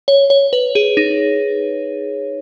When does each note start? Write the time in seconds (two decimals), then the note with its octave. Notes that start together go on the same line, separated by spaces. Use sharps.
0.08 C#5
0.30 C#5
0.53 B4
0.75 G#4
0.97 D#4